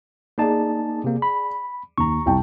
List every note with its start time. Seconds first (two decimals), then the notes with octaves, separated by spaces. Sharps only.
0.38 A#3 D#4 G#4 D5 A5
1.04 C3 A#3
1.22 B5
1.98 D#2 A#5 C#6
2.26 C2 G5 A5